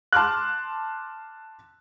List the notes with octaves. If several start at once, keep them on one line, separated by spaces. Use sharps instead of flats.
A5 C6 D6 F6 F#6